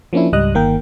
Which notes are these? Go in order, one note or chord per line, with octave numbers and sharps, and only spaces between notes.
F3 A#3 C#4 D4 E4
C#2 G#2 G3 D#5 D#6 F#6
G1 D#3 A#3 A#4 G5